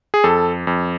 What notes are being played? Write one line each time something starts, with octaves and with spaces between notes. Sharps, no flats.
G#4
F2 A4
F2